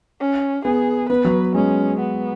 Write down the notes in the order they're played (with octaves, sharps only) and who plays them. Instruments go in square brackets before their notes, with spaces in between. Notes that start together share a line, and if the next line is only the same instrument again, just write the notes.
[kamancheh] C#4
[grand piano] B3 [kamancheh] G#4
[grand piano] B3 [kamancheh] B4
[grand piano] F#3
[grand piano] G#3 [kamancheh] C#4
[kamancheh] B3